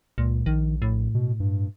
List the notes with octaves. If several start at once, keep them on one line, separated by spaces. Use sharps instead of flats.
C#2 A#2
A#1 D#3
A2
B2
G2